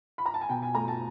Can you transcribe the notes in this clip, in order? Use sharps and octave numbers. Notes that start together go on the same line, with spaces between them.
B5
A#5
A5
G#5
B2 G5
G#5
A3 A#5
A5